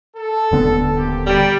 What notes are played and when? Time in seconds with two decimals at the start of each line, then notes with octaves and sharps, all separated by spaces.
0.16 A4
0.51 D#1 D3 B3
0.96 A#3 C4 G4
1.27 G3 A#3 A#4 D5